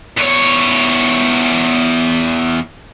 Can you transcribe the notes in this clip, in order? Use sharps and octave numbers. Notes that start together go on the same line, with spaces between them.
E2 C#5